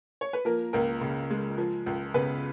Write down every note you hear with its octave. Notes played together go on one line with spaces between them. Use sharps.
C#5
B4
F3 A#3 A#4
C#2 A#3 A#4
C#3
G#3
F3
C#2
C#3 B3 B4